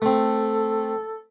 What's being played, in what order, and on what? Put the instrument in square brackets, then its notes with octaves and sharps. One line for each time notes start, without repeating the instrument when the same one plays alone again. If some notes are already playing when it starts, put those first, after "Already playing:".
[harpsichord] A3 C4 [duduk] A4